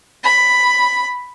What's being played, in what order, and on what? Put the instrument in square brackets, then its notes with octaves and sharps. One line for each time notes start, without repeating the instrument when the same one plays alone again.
[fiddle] B5